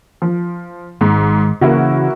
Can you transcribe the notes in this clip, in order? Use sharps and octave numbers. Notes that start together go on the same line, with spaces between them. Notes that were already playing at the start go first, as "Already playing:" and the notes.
F3
G#1 G#2
C#3 E3 A#3 E4 F#4